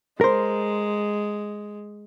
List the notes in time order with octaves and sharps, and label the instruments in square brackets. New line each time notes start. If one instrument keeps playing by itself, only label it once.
[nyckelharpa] G#3 [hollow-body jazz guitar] A#4 C5